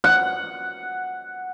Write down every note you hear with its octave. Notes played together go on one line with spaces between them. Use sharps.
F#5